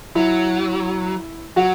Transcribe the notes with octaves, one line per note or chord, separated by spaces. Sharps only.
F#3 E4
F#3 F#4